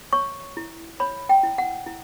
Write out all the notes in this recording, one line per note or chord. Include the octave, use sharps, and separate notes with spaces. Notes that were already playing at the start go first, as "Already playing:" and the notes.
C#5 C#6
E4
C#5 B5
G5
E4
F#5
E4